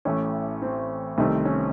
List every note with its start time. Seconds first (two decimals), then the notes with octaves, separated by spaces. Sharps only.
0.05 A1 A2 A3 C#4
0.62 C4
1.18 C2 C3 D#3 A3 C4
1.45 C#4